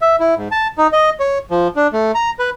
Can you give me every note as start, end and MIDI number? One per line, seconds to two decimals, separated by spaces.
0.02 0.16 76
0.20 0.35 64
0.37 0.48 44
0.51 0.68 81
0.78 0.87 63
0.93 1.10 75
1.20 1.38 73
1.51 1.68 53
1.76 1.87 62
1.93 2.12 57
2.15 2.30 82
2.39 2.50 71